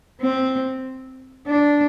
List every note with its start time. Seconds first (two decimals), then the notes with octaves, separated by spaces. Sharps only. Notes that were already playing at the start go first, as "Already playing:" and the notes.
0.21 C4
1.47 D4